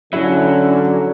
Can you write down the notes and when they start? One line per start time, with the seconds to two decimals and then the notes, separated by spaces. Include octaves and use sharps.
0.13 D3 F#3 C#4 E4